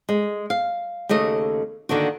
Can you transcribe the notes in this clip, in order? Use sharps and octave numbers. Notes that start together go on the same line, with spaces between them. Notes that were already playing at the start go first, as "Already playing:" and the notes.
G#3
F5
D#2 C#3 A3 D#5
D3 D#3 A#3 D4 F#4